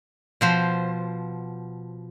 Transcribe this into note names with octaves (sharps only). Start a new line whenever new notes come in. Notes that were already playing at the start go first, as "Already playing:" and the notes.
B2 F3 C5